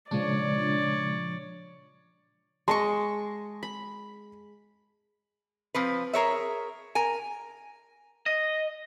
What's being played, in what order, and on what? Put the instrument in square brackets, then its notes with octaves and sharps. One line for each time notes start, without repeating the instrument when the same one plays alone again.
[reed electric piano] A#2 C#3 G#3 [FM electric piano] F3 D4 [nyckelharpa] C#5 D5
[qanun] G#3 D#5 C#6 [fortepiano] A5 C6
[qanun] B5
[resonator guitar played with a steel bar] F3 C4 B4
G#4 A#4 C#5 E5
A#4 G#5
[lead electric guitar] D#5